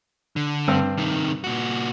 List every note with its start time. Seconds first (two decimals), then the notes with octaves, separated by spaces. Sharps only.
0.36 D3
0.68 G2 C4 E6
0.98 C3 D#3
1.44 A#2 F#4